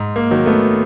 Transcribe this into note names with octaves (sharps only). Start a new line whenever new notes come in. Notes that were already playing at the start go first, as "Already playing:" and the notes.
Already playing: G#2
A#3
D#3 F#3
A3 B3